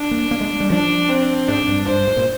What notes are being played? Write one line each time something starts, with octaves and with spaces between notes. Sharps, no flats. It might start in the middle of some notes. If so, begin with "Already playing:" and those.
Already playing: D4
A#3
A#3
G#3
G3
F3 D4
C4
G#2 D4
G2
G2 C5
G#2
A#2